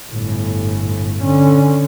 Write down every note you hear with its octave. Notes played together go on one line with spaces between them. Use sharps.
G1 A2
D3 C#4